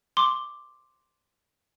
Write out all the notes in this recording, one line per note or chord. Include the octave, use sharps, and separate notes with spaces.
C6 D6